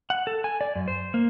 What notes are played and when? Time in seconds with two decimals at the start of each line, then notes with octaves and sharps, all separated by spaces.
0.10 F#5
0.27 A4
0.44 G#5
0.61 D5
0.75 F#2
0.88 C5
1.14 A#3